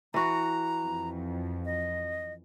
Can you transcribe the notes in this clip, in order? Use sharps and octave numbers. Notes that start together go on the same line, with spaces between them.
E3 F#4 A#5
F2
D#5